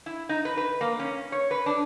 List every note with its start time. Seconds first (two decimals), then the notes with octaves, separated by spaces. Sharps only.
0.06 E4
0.29 D#4
0.45 B4
0.57 B4
0.81 A#3
1.00 C#4
1.32 C#5
1.51 B4
1.66 D4